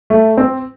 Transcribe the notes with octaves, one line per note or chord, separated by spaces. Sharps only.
A3
C4